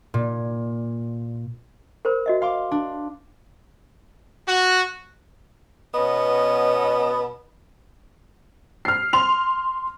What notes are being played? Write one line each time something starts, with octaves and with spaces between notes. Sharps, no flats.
A#2
A#4 C5 B5
F#4 D#5 E5
F5 C6 D6
D4
F#4
B2 B3 C#4 D#5
F6 C7
C6 F7